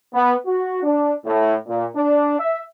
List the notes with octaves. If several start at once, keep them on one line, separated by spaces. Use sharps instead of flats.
B3
F#4
D4
A2
A#2
D4
E5